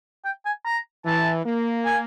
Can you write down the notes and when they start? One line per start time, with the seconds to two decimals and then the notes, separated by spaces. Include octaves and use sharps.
0.25 G5
0.46 G#5
0.66 A#5
1.06 E3 A5
1.45 A#3
1.85 G#5